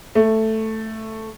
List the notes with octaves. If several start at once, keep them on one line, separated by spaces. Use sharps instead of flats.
A3